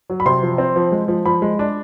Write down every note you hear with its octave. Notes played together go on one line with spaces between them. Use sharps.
F#3
B5
C3 C6
F3
C4
F3
G#3
F3
F3 B5
G#3
D4